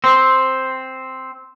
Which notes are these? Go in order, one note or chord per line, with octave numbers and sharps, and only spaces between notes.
C4